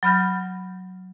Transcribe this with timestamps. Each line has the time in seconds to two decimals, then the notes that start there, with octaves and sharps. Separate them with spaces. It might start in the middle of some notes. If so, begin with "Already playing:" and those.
0.03 F#3 B5 F6 G6 A#6